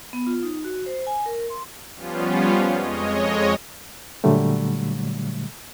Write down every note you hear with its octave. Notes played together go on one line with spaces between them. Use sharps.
B3
F4
D#4
F#4
C5
G#5
A#4
C6
F3 G3 B3 C#4 F4
F2 G#3 C#5 D#5
A#2 D3 F#3 G3 A3